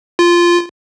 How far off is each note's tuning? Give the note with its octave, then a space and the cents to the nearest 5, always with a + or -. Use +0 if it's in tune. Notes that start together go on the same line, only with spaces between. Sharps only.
F4 -10